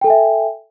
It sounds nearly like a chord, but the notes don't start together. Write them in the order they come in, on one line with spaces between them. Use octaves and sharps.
G5 A4 G#5 E5